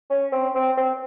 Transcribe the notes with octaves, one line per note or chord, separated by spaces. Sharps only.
C#4
C4
C4
C4